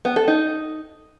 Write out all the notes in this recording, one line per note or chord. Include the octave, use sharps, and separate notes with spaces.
B3
A4
D#4